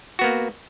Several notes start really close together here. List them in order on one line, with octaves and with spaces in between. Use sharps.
F#4 B3 A#3